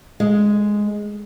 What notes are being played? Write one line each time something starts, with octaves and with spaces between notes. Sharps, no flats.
G#3